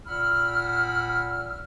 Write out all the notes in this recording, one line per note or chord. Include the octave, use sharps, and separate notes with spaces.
A#2 F#5 B5 E6 F6